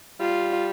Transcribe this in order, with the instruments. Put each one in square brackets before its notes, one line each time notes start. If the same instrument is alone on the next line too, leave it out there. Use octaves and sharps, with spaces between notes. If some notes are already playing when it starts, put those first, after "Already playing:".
[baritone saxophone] G3 [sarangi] F4